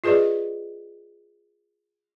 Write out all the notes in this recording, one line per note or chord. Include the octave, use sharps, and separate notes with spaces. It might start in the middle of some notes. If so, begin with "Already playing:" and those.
F4 G#4 B4 D5 D#5